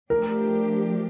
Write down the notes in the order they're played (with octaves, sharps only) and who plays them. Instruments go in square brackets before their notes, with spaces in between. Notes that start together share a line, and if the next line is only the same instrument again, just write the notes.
[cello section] F3 A3 D4 G4 [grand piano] A#4